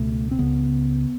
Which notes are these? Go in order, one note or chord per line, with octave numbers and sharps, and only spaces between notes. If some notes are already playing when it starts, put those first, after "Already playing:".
Already playing: C#2 B2 A3
C4
C#2 C#3 B3